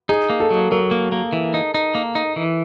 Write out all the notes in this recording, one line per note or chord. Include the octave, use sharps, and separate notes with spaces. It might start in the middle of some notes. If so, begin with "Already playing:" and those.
D#4 G#4
A#3
A4
F#3
F#3 A#4
A#3
A#3
E3
D#4
D#4
A#3
D#4
E3